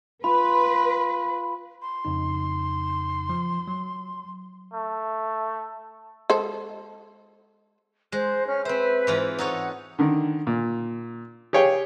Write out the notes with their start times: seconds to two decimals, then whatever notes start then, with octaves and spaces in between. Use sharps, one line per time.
0.24 F4 B4 B5
1.82 C6
2.05 F2 C#3 D#4
3.29 F3
3.67 F#3
4.73 A3
6.30 G#3 A4 C5
8.12 G#3 C5 F#6
8.46 C#4 F6
8.65 C4 B4 C5 E5
9.07 G#2 E3 F4
9.38 D#4 A4 C#5 F#5
9.99 D3 D#3
10.47 A#2
11.53 G4 G#4 C#5 F5 G5